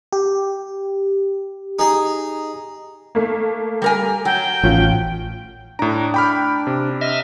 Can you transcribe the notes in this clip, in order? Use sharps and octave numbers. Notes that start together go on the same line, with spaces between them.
G4
D#4 G#4
A3 A#3
G3 A#4 G#5
F#3 G5
A1 F3 C#4 F4
A2 D4 A#5
G5 B5 F6
C3
D#5 E5 F6